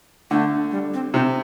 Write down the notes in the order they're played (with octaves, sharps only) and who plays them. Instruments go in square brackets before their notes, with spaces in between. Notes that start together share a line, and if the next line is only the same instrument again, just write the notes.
[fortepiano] D3 [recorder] A3
[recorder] G3
C4
[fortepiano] C3 [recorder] D#4